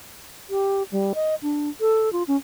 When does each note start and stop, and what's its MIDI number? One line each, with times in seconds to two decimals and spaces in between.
0.50 0.83 67
0.92 1.13 55
1.15 1.35 75
1.43 1.69 62
1.81 2.12 69
2.13 2.23 65
2.28 2.36 61